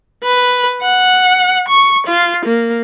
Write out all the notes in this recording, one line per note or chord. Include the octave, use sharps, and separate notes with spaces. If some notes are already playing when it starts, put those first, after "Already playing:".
B4
F#5
C#6
F4
A#3